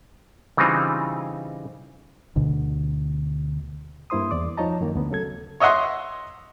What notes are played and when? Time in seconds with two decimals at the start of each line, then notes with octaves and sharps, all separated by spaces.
0.57 C#3 E3 G3 C4 D#4 F4
2.36 D2 B2 D3
4.10 G2 A#3 E4 C5 C6 D#6
4.31 E2 D5 D6
4.57 F3 D#4 C#5 D#5 A5 A#5
4.81 F#2 D#3 A#3
4.95 D2 B3
5.11 C#3 F#3 A4 G#6
5.60 C#5 D#5 E5 F#5 C6